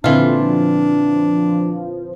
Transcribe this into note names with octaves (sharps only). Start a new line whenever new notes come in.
A#2 D3 E3 F3 C4 D4 F4